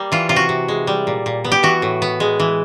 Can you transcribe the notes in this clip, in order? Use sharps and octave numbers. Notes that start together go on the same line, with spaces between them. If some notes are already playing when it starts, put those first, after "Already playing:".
Already playing: G3 A#3
E3 F4
C3 F4
F#4
C3
G#3
G3
A#2
A#2
B3
G4
E3 F#4
A2
B3
G#3
E3